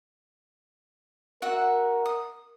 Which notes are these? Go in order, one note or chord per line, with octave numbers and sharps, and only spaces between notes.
F#4 A#4 E5 F#5
D#6